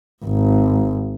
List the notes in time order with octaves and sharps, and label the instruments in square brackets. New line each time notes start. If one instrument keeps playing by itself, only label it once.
[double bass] G#1